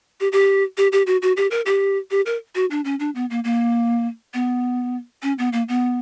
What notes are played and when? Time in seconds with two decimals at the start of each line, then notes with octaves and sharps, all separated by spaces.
0.21 G4
0.32 G4
0.78 G4
0.92 G4
1.07 F#4
1.22 F#4
1.37 G4
1.51 A#4
1.66 G4
2.11 G4
2.26 A#4
2.55 F#4
2.71 D4
2.85 C#4
3.00 D4
3.15 B3
3.30 A#3
3.44 A#3
4.34 B3
5.23 C#4
5.39 B3
5.53 A#3
5.69 B3